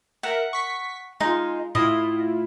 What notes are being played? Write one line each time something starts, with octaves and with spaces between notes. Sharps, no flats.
A#4 E5 F#5
C#6 B6
G#3 D#4 F4
A2 E4 F4 D#5